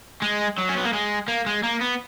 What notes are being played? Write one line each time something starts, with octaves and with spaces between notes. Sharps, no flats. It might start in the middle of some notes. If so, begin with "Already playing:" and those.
G#3
F#3
C#4
B3
A#3
G#3
A#3
G#3
A#3
B3